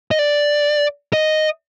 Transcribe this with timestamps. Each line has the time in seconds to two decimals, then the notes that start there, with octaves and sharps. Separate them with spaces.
0.11 D#5
0.19 D5
1.13 D#5